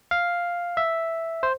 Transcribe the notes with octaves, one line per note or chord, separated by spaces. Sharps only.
F5
E5
C5